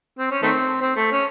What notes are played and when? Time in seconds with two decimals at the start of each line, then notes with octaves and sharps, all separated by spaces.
0.19 C4
0.31 C#4
0.43 D#3 A3 C4
0.81 C4
0.96 A3
1.12 C#4